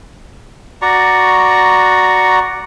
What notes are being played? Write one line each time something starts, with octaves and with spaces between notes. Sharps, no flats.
F#4 D5 A#5 C#6